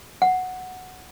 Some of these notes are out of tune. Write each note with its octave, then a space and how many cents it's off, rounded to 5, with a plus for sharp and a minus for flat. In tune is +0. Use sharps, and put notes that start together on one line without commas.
F#5 -5